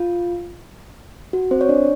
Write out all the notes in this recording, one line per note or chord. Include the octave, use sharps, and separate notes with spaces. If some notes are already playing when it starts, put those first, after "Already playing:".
Already playing: F4
F#4
C4 C5
C#5
D4 D5